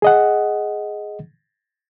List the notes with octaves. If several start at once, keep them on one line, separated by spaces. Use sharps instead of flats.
G#4 D#5 F#5